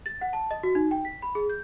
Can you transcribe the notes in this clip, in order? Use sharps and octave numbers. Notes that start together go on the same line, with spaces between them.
A6
F#5
A5
D#5
F#4
D#4
G5
B6
B5
G#4
G6